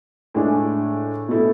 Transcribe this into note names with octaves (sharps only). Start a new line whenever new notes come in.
A2 G#3 D4
B2 A3 E4